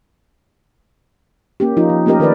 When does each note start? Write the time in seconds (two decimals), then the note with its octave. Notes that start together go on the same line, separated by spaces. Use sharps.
1.60 A#3 C#4 G4
1.77 F3 D#4 F4
1.90 F3
2.06 A3 A#3 C#4 G4 A#4 D#5
2.20 D#3 A#4 B4 D5